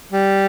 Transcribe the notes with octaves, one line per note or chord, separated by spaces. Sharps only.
G3